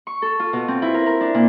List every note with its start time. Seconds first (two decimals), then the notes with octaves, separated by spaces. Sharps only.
0.07 C#6
0.22 A4
0.40 F4
0.53 B2
0.68 C4
0.82 E4
0.94 A#4
1.06 A#4
1.21 D4
1.34 A#2